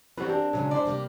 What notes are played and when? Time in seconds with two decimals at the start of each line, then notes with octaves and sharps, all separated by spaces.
0.18 E3 G3 C4 F#4 A#4 B4
0.29 D4 G4
0.53 A#2 C#3 F#3 G#3
0.71 G#3 E4 C5 D5
0.85 C3 G3 A#3